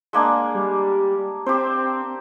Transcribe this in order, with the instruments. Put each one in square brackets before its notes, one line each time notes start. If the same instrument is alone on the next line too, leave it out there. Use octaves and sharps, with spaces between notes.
[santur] G#3 A#3 D4
[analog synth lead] G3
[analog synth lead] C4 [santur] G4 C5